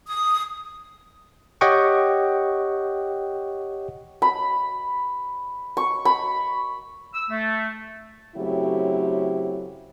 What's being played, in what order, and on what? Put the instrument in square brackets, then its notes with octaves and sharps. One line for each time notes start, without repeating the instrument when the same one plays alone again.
[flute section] D#6
[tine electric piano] G4 C#5 D#5 F#5 G5 C#6
[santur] B5
C#6
B5
[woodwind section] E6
A3
[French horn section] C#3 F#3 A3 C4 E4 G4